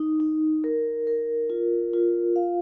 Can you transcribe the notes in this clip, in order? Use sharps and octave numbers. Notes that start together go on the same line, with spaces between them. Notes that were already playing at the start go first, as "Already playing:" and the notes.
Already playing: D#4
D#4
A#4
A#4
F4
F4
F5